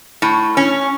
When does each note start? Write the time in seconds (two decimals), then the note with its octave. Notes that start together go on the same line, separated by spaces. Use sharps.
0.22 A2
0.57 C#4